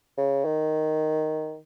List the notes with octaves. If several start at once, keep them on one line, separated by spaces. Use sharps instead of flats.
C#3
D#3